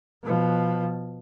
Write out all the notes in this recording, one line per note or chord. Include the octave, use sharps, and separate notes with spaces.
B2 F3